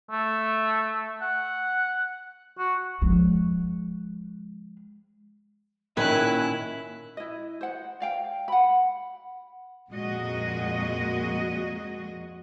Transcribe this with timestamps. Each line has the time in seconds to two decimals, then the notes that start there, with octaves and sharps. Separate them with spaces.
0.11 A3
1.21 F#5
2.58 F#4
3.02 F3 G#3
5.97 A#2 D#3 C#4 E4 B4 G#5 F#6
7.17 E4 D#5
7.61 C5 F#5
8.00 D5 F5 G5
8.48 F#5 B5
9.91 F2 A#2 G#3 F#4 D#5